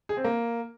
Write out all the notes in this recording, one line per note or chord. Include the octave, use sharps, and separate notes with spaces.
G#4
C4
A#3